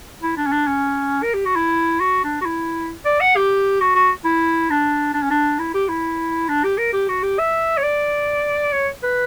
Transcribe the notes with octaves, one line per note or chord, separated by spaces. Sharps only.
E4
D4
C#4
D4
C#4
A#4
G4
F#4
E4
F#4
D4
F#4
E4
D5
F#5
G4
F#4
F#4
E4
D4
D4
C#4
D4
E4
G4
E4
D4
G4
A#4
G4
F#4
G4
E5
C#5
D5
C#5
B4